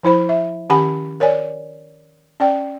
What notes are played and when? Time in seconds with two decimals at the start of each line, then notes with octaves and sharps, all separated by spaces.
0.03 F3 E4 C5 B5
0.29 E5
0.70 D#3 C#4 G4 F#5 G#5 B5
1.20 A#4 C#5 D5 G#5
2.40 C#4 D5 G5